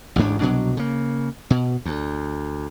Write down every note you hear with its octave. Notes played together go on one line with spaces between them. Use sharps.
A1 D2 G#2 D4
C2 B2 F#3 D4
C#3 A#3
B2
D2